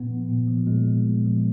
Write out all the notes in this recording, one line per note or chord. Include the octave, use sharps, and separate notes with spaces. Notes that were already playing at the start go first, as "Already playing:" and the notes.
Already playing: A#2 B3
F3
A#2
F3
A#2 G#3
F3
A#2
F3